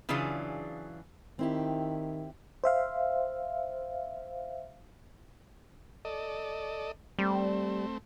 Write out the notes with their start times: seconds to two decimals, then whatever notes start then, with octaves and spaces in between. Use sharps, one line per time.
0.09 C#3 E3 F#3 D4 F4 G#4
1.39 D#3 C4 E4 G4
2.64 C5 E5 F5
6.05 A4 D5 D#5
7.19 G3 A3 C4